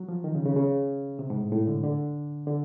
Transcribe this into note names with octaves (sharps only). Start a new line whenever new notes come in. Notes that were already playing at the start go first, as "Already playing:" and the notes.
Already playing: F#3
F3
D#3
C#3
C#3
C#3
C3
G#2
A2
A2
D3
D3
D3